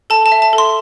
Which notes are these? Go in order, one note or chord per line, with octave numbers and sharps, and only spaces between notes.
A4 A5
A5
E5
A5
A4
C6